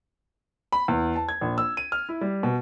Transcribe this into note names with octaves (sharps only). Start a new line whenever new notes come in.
B5
E2
A5
G#6
A#1
E6
D#7
F6
E4
G3
B2